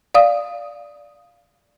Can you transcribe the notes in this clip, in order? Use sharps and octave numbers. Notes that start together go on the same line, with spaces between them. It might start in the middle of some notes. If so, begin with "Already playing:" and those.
D5 F5 D#6